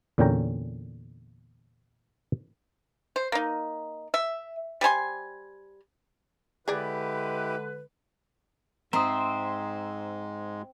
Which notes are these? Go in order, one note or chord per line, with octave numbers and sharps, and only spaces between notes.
E2 A#2 D3 C#4 G5 A#5
C5
A#3 D#4
E5
G3 C5 G#5 C6
D3 G#3 E4 G4 G#4 B4 D5
G#2 G#3 C4 C5 E5 A#5 D#6